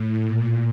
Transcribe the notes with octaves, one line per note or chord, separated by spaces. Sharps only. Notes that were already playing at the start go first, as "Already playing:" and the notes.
Already playing: A2
A#2